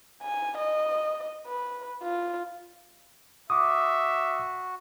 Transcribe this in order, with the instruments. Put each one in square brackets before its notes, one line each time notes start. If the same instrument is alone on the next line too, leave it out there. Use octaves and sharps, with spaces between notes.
[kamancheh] G#5
D#5
B4
F4
[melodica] F#4 [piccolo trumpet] E5 [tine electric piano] D6 D#6